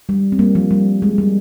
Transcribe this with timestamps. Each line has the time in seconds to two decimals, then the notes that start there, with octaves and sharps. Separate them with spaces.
0.09 G3
0.32 C4
0.39 G3 A#3
0.55 F3
0.71 G3
1.02 G#3
1.18 G3